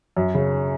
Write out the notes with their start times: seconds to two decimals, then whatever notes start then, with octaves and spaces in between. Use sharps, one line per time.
0.16 F#2
0.34 C#3